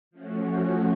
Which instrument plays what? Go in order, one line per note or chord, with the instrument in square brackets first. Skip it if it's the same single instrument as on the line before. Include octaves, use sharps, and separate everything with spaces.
[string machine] F3 A3 C#4 F#4